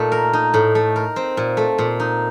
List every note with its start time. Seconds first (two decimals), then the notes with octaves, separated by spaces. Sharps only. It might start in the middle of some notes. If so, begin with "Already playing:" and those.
Already playing: A#2 A3 D#4
0.12 A#4
0.33 D#4
0.54 A2
0.75 A3
0.96 A#4
1.16 C4
1.37 A#2
1.57 A3
1.78 A#2
2.00 D#4